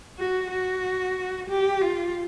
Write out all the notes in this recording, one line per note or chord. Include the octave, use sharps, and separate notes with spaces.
F#4
F#4
G4
F4